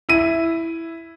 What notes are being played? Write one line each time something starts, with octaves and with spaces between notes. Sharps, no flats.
E4 D#7